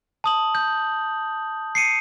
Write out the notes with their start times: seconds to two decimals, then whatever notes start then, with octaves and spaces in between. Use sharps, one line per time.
0.24 A5 D#6 F#7
0.55 G6
1.75 C7 C#7 D#7